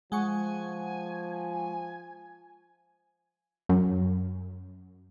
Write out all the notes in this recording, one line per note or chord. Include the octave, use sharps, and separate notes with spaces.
F3 G#3 F#5 G#5 C#6
F#2